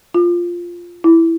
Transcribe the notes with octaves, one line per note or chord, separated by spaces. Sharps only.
F4
E4